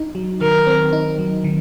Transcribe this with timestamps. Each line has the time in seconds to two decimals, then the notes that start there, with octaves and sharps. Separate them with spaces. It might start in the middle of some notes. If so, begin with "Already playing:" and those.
Already playing: D#4
0.15 F#3
0.41 D#3 A#4
0.67 C4
0.93 D#4
1.19 F#3
1.44 D#3